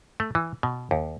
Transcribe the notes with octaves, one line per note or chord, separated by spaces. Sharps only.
A3
E3
B2
D#2